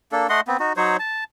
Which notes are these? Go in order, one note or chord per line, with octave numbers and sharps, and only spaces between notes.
A#3 D4 A4
A3 D#5 F#5 C6
B3 C4
D#4 F#4
F#3 D#4 C5 C#5
A5